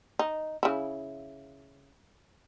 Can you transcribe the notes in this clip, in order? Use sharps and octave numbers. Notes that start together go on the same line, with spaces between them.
D#4
C#3 E4